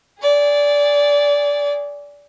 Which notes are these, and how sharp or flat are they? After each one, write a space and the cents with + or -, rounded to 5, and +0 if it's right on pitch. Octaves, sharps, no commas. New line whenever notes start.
G#4 -15 D5 -20